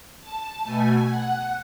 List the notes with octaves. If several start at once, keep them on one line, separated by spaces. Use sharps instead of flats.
A5
B2 A3 G#5
F#5